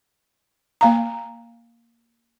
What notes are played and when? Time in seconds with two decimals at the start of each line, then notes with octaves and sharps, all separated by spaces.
0.81 A#3 F5 A#5